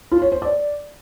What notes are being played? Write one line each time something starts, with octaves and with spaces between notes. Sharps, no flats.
F4
C#5
C5
D5